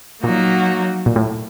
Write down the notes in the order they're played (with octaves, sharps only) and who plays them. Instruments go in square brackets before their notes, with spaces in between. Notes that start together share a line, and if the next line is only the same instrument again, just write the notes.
[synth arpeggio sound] A#2 [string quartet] F#3 A#3 D#4 F#4
[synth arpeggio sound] A#2
A2